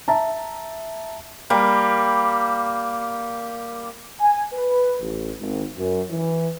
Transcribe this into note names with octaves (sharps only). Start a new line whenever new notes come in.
E5 A5 A#5
G3 A#3
G#5
B4
A1
G#1
F#2
E3